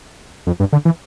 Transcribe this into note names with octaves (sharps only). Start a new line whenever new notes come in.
F2
G2
D3
E3